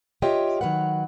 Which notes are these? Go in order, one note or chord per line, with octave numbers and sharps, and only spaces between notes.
F4 G4 C#5 D#5 E5 G5
D#3 E3 F#3 B4 F#5